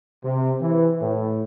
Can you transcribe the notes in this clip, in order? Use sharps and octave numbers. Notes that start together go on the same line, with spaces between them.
C3
E3
A2